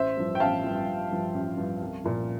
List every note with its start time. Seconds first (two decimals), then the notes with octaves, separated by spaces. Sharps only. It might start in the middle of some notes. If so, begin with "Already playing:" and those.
Already playing: A1 C5 E5
0.17 G2 F3
0.35 G5
0.40 A1 F5 A5
0.64 G2 F3
0.88 A1
1.11 G2 F3
1.35 A1
1.57 G2 F3
1.82 C2
2.04 A#2 F3